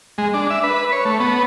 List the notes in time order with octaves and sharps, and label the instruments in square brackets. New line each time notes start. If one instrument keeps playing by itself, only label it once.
[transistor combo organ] G#3
D4
E5
B4
C#5
A3
B3